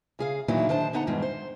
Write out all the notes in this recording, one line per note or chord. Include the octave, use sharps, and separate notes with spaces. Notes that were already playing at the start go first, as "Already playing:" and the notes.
C#3 G#4 F5
E2 A#2 D#3 F#3 D4 E4
D#3 D4 C5 A5
D3 B3 D#4 F#5 A#5
E2 G2 D#3 G#3
C5